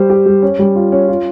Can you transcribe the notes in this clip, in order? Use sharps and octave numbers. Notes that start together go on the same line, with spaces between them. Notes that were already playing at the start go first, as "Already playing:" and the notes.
Already playing: G3 C5
G4
G3
C#4
G3
F4
C#4
F4